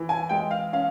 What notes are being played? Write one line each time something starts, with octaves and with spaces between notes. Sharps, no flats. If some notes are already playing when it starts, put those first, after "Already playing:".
Already playing: E3
G#5
G#3 G5
F5
C#4 F5